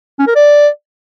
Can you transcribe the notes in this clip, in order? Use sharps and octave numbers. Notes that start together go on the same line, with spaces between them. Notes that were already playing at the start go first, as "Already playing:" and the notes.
C#4
A#4
D5